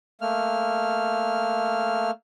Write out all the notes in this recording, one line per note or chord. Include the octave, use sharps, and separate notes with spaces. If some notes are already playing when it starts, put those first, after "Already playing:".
A3 A#3 F6